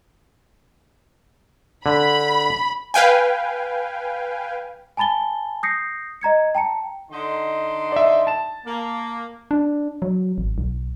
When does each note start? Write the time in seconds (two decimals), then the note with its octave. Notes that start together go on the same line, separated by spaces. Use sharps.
1.86 D3 B5
2.94 B4 F5 G5 G#5
4.97 G#5 A5 B5 A6 G7
5.63 D#6 G6 A#6 C7 C#7
6.21 D#5 A#5 G#6 C#7
6.55 G5 A5 A#5 C#7
7.10 D3 D#4 C6
7.92 D5 E5
8.27 A5 E7
8.65 A#3
9.51 D4
10.02 F#3
10.38 G#1
10.58 B1